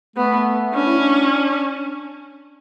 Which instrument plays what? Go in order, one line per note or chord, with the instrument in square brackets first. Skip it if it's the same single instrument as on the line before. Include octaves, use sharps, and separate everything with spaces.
[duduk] A3 [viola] B3
[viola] C#4 [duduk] D4
[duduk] E4
D4